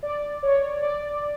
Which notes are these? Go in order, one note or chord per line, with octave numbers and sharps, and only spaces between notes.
D5
C#5
D5